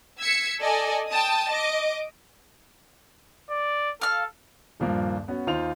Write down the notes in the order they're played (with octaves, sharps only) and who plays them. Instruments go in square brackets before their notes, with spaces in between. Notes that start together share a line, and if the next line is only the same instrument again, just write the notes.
[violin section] E6 G#6 B6 C#7
A4 D5 D#5 G#5
G5 A5 D#6
D#5 D6
[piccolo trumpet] D5
[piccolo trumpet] A4 [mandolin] F5 F6
[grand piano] D#1 G2 F3 A#3
B3 C#4 F#4
D#2 D#4 F4 C5 F7